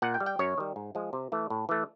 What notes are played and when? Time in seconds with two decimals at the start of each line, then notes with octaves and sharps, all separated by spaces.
0.02 A#2 F#5
0.14 G5
0.20 G3
0.26 G5
0.39 F#2 C#5
0.58 D#3 G3
0.76 G#2
0.95 F3 G#3
1.13 C3
1.32 E3 A3
1.50 A2
1.69 E3 A3